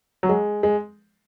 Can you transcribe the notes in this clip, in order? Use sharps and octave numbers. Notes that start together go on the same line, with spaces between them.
F#3
G#3
G#3